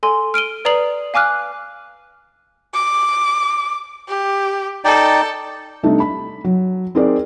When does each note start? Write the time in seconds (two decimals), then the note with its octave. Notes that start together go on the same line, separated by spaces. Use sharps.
0.03 A4 G#5 C6
0.34 F6 D7 D#7 G7
0.65 B4 D5 A#5 D#6 C7 F#7
1.14 F5 G#5 D6 F6 F#6
2.74 D6
4.08 G4
4.85 D#4 A4 D5 G5
5.83 C3 G3 A3 D4 D#4
6.00 B5
6.44 F#3
6.95 C4 D#4 G#4 A#4 D5